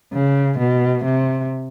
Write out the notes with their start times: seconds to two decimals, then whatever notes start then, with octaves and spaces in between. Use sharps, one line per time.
0.14 C#3
0.59 B2
1.05 C3